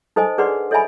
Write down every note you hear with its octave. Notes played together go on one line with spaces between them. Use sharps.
D#4 A4 C5 D#5 G#5
D4 G#4 B4 D5 F#5 C6
A4 C#5 D#5 E5 G#5 B5